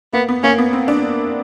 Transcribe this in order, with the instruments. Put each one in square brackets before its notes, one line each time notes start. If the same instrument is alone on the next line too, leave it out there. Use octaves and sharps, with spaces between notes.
[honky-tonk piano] A#3 [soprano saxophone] B3
[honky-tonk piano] B3
[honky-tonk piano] A#3 [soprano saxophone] C#4
[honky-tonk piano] B3
C4
D4